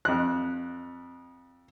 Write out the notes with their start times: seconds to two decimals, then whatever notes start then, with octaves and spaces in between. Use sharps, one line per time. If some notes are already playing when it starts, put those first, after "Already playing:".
0.05 F2 F#6